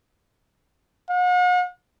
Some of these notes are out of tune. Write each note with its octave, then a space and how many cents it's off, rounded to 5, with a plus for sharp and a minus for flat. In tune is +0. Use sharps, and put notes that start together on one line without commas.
F#5 -45